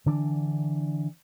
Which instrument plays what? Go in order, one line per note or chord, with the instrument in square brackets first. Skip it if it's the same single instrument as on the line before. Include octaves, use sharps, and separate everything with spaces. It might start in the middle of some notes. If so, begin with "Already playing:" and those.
[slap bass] D3 E3 D4